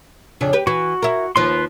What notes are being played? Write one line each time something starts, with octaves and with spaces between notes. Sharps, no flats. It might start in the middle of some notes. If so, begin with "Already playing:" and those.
F2 C#3 D4
G4 B4
E3 F#4
E4 A#4
D#2 F3 B4 C6